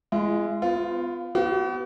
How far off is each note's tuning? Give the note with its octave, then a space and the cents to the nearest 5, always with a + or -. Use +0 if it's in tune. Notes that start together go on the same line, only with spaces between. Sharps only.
G#3 +0 E4 +45
B3 +35 F4 +0
B3 +0 F#4 +45 F5 +0